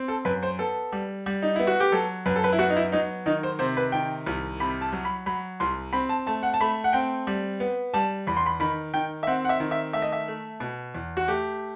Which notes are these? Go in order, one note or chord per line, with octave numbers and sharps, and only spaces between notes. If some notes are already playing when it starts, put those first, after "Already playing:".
Already playing: C4
A4
F#2 B4
C5
B3 A4
G3
G3
D#4
B3 E4
F#4
G4
F#3 A4
F#2 B4
A4
B4
E4
B3 F#4
D#4
E4
F#3 D#4
D#3 D#4
C5
C3 C5
B4
D#3 G5
C2
C3 B5
A5
F#3
B5
F#3 B5
C2 C6
C4 B5
A5
A3 A5
F#5
A5
A3 B5
F#5
C4 G5
G3
B3
G3 A5
E2 B5
C6
B5
D#3 B5
D#3 G5
E5
C4 F#5
F#5
E5
D#3
E5
A3 E5
D#5
E5
A3
B2
E2
F#4
A3 G4